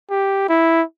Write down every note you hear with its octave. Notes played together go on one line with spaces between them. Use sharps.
G4
E4